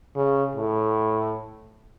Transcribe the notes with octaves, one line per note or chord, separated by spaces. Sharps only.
C#3
A2